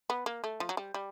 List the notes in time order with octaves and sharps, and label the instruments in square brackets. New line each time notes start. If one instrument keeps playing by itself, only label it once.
[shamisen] B3
A#3
A3
F3
F#3
G3
G3